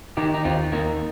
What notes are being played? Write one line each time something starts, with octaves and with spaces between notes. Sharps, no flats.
D#3 D#4 G4
D#4
D#2 C4 F4
D#3 A#3 D#4